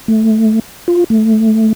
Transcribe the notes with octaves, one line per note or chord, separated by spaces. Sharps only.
A3
F4
A3